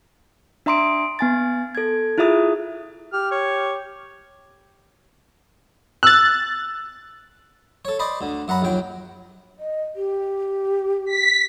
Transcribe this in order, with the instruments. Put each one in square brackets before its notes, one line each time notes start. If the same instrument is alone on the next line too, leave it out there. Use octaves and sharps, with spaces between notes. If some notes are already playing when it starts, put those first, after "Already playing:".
[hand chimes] D4 E5 A#5 C6 D#6 D7
B3 G#5 A6
A4 G#6
E4 F4 G#4 E5 D#6
[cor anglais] G4 [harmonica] F6
[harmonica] C#5
[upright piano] E6 [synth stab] F#6 A6
[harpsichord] A4 C#5
C5 D5 D#5 B5
D2 D3
F#2 F#5 A#5 B5
A#1 D#2 F#3 G5
[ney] D#5
G4
[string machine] B6